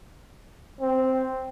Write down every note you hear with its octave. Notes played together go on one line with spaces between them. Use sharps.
C4